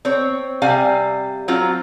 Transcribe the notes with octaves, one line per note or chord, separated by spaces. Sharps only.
C4 C#5
C3 G3 F5 G#5
F#3 C4 F4